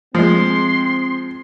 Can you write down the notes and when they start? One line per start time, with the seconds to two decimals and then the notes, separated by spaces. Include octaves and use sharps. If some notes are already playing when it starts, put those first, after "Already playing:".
0.15 F3 G#3 C4 C6